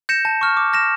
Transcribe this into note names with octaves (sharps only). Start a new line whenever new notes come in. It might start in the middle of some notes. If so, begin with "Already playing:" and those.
G6 A#6 C#7 E7
A5
C#6 F6
D6
F6 A#6 E7